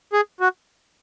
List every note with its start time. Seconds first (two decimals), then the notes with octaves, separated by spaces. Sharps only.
0.13 G#4
0.40 F#4